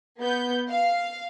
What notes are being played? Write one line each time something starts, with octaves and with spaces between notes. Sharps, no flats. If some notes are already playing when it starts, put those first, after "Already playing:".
B3 G6
F5